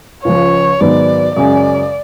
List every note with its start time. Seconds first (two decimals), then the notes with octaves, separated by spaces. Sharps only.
0.25 C#2 C#3 F3 C#5
0.81 G#1 G#2 F#3 B3 D5
1.36 F#2 C#3 G#3 C#4 D5